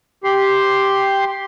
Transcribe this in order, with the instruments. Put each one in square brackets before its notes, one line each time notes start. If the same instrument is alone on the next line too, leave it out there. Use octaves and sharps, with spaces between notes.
[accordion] G4 C6